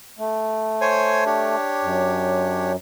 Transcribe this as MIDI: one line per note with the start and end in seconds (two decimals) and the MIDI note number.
0.19 1.56 57
0.81 1.25 72
0.81 1.25 73
0.81 1.25 80
1.26 2.73 62
1.26 2.73 67
1.26 2.73 73
1.83 2.76 42